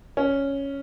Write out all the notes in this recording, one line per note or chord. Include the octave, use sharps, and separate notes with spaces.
C#4